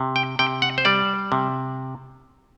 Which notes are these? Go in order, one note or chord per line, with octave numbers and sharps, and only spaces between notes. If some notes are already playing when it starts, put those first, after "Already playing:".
Already playing: C3
G5
C3 G5
F#5
C5
G3 D5
C3